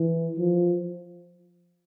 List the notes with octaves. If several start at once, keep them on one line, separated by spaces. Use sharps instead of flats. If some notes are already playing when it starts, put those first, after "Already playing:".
Already playing: E3
F3